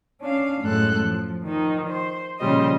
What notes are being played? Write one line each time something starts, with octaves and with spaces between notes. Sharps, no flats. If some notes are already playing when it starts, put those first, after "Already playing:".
C#4 D4 F5
F#2 A2 G#3 A4 F#6
F3
D#3 F3 D#4
C5
A#2 C#3 F3 G3 C5 D#5